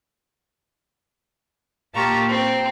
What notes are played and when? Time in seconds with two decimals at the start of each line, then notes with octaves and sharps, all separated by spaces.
1.94 A#2 F4 G4 A5 A#5 C#6
2.29 C4 G5